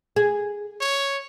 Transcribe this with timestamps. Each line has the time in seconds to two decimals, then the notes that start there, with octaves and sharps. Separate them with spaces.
0.16 G#4
0.81 C#5